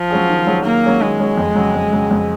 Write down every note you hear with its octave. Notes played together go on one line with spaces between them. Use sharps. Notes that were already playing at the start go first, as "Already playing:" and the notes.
Already playing: F3
F#3 C#4 G#4
D#3
F#3 C#4 G#4
D#3 A#3
F#3 C#4 G#4
D#3 G#3
F#3 C#4 G#4
F2
C#3 F#3
F2
C#3 F#3
F2